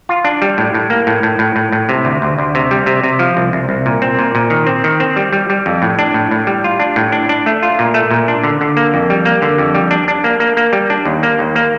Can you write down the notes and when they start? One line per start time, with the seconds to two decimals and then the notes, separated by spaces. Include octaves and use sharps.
0.09 F4
0.25 D4
0.42 G3
0.58 A2
0.74 A2
0.90 A#3
1.07 A2
1.23 A2
1.39 A2
1.56 A2
1.72 A2
1.89 C3
2.05 D2
2.22 D2
2.38 D2
2.55 C3
2.71 G3
2.86 C3
3.04 C3
3.19 F3
3.37 C2
3.53 C2
3.69 C2
3.86 A#2
4.02 C4
4.19 A#2
4.35 A#2
4.50 D#3
4.67 C4
4.84 D#3
5.00 C4
5.16 G3
5.33 G3
5.50 G3
5.66 F2
5.82 A2
5.99 D4
6.14 A2
6.31 A2
6.47 G3
6.64 F4
6.80 D4
6.96 A2
7.12 D4
7.29 D4
7.46 A3
7.63 F4
7.79 A#2
7.94 A3
8.11 A#2
8.28 D4
8.43 D3
8.61 D3
8.77 A#3
8.94 F2
9.10 G3
9.25 A#3
9.42 D3
9.58 F2
9.75 G3
9.91 D4
10.08 D4
10.24 A#3
10.40 A#3
10.57 A#3
10.73 G3
10.90 D4
11.05 D#2
11.23 A#3
11.39 D#2
11.55 A#3